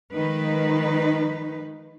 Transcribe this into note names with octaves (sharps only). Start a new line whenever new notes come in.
D#3 F3 G#3 D#4 B4